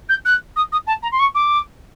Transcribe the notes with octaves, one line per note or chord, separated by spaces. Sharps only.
G6
F#6
D#6
D#6
A5
A#5
C6
C#6
D6